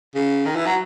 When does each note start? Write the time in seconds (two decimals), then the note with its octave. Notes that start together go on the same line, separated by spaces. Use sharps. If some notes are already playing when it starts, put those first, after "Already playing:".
0.14 C#3
0.45 D#3
0.55 E3
0.66 F#3